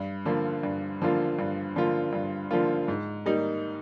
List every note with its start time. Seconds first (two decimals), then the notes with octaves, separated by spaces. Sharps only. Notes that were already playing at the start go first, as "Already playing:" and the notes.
Already playing: G2
0.25 D3 F3 A#3 F4
0.63 G2
1.02 D3 F3 A#3 F4
1.39 G2
1.76 D3 F3 A#3 F4
2.13 G2
2.51 D3 F3 A#3 F4
2.88 G#2
3.26 G3 A#3 D#4